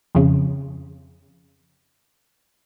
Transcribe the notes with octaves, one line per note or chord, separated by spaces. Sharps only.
F2 C#3